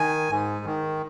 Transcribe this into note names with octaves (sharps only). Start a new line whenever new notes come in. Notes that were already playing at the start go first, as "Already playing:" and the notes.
Already playing: D#3 G#5
G#2
D#3